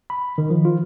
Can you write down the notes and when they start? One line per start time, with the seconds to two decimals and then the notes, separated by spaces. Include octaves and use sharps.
0.10 B5
0.38 D#3
0.50 F3
0.65 F4